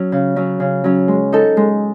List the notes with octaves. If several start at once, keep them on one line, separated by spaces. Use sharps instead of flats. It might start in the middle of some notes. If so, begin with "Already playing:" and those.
Already playing: F#3 C#4
C#3
F#3 C#4
C#3
F#3 C#4
G#3
D#4 A4
G#3